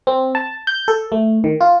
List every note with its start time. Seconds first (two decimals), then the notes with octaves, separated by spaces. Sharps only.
0.07 C4
0.35 A5
0.67 G6
0.88 A4
1.12 A3
1.44 D#3
1.61 F4